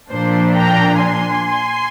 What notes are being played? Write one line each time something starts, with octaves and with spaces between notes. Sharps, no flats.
A#2 F3 A#3 D4 C5
G5 A#5
G#5 C6